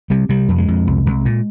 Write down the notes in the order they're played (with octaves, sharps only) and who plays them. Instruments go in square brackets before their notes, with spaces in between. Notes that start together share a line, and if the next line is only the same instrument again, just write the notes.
[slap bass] C3 G3
C3 G3
F2
G#3
F2
C2
C2
A#2